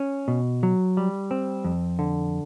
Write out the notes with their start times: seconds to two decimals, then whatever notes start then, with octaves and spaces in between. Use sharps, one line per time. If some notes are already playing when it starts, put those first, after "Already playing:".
Already playing: C#4
0.28 B2
0.63 F#3
0.97 G3
1.31 C4
1.64 F2
1.99 D3